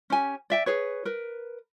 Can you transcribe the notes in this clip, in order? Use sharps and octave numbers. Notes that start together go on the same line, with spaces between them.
C#4 G4 G#5
D5 E5 G5
G#4 B4 C#5
A#4 B4